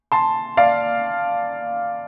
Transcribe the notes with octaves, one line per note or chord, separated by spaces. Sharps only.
A5 C6
D5 F5